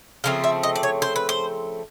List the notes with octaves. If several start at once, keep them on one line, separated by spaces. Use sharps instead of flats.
C#3 F3 A3 C4 F5
E5
D#5
D5
C#5
C5
B4
C5